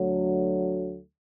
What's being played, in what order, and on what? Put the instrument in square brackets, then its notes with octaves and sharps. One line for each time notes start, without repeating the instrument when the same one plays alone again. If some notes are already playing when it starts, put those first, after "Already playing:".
Already playing: [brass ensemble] D2 D3 F#3 A3